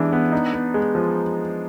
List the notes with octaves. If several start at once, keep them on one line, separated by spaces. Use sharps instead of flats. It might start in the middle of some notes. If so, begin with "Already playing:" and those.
Already playing: E3 G#3 B3 D4
B3
D#4
B3
G#3
F3